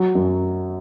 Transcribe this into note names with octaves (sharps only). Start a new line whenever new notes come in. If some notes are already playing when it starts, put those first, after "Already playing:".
Already playing: F#3
F#2